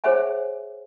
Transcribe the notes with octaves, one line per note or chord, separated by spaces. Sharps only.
G#4 C5 C#5 E5 F#5 G#5